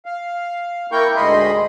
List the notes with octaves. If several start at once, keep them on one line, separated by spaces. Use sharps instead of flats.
F5
A#3 E4 A#4 G5 C#6 G6
D2 G#2 D#5 B5 C6